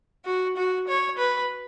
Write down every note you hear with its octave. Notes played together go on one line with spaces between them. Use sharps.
F#4
F#4
C#5
B4